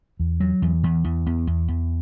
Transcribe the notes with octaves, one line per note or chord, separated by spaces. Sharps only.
E2
F#3
E2
E2
E2
E2
E2
E2